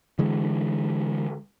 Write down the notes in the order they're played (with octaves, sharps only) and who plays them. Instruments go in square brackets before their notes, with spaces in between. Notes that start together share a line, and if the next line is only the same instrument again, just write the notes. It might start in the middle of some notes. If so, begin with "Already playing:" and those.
[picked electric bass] D3 E3 G#3